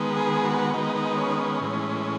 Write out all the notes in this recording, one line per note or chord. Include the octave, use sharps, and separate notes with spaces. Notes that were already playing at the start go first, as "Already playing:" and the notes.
Already playing: D#3 G#3 B3
G#4
F#4
D#3 G#3 B3 D#4
D#4
C#4
D#4
C#4
A2 E3 G#3